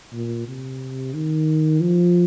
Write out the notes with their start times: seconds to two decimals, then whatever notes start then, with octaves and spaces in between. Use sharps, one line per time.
0.13 A#2
0.47 C3
1.14 D#3
1.80 F3